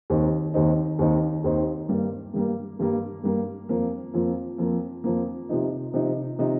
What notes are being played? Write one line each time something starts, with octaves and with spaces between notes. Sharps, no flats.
D#2 D#3 C4 D#4
D#2 D#3 C4 D#4
D#2 D#3 C4 D#4
D#2 D#3 C4 D#4
G2 G3 A#3
G2 G3 A#3
G2 G3 A#3
G2 G3 A#3
F2 F3 A#3
F2 F3 A#3
F2 F3 A#3
F2 F3 A#3
C3 F3 D#4
C3 F3 D#4
C3 F3 D#4